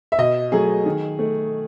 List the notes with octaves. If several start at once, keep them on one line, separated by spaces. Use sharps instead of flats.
E5
B2 D#5
F#3 A3 G#4
D#3
A3